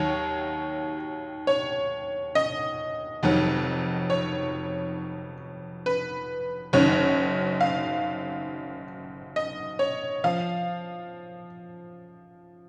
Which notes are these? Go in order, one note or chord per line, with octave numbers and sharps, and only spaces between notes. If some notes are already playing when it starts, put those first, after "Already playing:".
Already playing: D#2 D#3 F#3 C#5
C#5
D#5
F1 F2 D#3 F#3
C#5
B4
F#1 F#2 D#3 C#5
F5
D#5
C#5
F3 F5